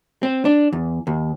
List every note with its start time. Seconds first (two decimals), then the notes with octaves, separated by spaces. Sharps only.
0.23 C4
0.45 D4
0.73 E2
1.07 D#2